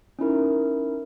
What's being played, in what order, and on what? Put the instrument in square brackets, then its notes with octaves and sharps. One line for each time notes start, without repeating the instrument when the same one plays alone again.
[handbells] C#4 D#4 E4 A#4